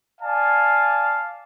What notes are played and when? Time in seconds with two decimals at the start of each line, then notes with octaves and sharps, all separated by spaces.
0.20 D5 F5 G#5 A5